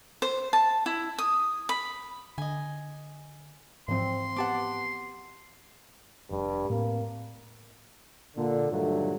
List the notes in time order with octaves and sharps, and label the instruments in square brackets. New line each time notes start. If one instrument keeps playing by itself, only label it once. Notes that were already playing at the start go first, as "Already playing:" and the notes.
[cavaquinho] C5
A5
E4
D#6
B5
[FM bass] D3 [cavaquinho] D#5 G#5
[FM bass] G#2 [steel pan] E3 F3 C4 [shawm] C6
[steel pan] B3 G4 [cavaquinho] F#5 A5 D6
[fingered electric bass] F1 D4 [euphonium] G2
[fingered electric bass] A2 C4 [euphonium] A#3
[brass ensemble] A#2 D3
G2 A#2 D3 D#3 F#3 A3